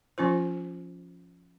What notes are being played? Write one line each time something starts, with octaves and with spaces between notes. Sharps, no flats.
F3 C#4 F4 C5